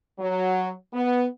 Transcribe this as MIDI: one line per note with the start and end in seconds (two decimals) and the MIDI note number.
0.19 0.72 54
0.93 1.25 59